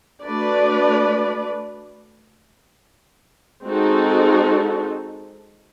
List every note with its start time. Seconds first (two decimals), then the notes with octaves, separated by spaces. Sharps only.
0.23 A3 D4 F#4 B4 D5
3.64 G#3 C4 D#4 F#4 A4